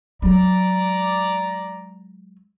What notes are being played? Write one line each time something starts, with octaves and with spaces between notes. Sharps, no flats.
F#3 G#3 D5 A#5